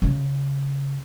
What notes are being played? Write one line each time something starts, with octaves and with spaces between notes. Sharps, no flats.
C#3